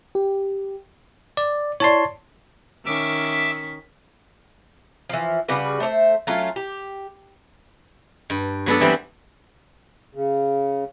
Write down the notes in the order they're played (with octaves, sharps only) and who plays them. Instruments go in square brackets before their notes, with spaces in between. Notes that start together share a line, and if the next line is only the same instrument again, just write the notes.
[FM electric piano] G4
[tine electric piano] D5
[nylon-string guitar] E4 D5 [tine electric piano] C#5 A5 C6
[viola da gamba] D#3 C#4 [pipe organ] E5 D6
[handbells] B6
[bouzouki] E3 F3
C#3 G3 F#4 B4
A3 C5 C#5 E5
F#3 A3 C#4 F4
G4
[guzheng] G2
F#3 B3 D4 A4
E3 G3 C4 E4
[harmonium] C#3